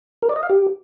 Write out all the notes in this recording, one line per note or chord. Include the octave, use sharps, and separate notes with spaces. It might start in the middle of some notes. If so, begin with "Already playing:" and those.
A#4
D5
D#5
F5
G4